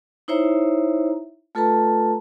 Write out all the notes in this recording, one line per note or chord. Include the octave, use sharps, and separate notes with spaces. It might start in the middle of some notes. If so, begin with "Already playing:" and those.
D#4 E4 C5 C#5 E5 A#5
A3 F4 A4 B4 A5 A#5